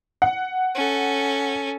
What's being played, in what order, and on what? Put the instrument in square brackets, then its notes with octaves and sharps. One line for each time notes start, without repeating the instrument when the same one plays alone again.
[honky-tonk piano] F#5
[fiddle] C#4 A4